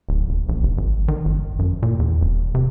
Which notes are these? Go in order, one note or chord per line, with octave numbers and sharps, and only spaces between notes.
D1
D#1
A#1
F1
G#1
D#3
G1
F#2
A#2
E2
D#1
C3